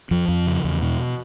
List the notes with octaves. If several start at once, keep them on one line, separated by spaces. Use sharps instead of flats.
F2 F3
F2
C#3
E2
B2